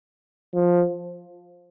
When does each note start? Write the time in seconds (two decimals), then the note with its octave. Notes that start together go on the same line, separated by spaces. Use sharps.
0.54 F3